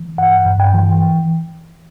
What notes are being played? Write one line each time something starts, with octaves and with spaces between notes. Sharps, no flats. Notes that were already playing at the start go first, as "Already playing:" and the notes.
Already playing: E3
G2 F#5
G2
G5
E3